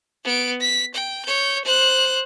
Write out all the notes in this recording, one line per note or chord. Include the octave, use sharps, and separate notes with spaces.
B3 D7
B6
G5
C#5 G6
C5 F#6